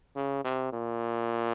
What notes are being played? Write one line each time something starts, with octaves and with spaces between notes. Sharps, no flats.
C#3
C3
A#2